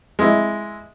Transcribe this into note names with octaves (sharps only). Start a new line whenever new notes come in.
G#3 E4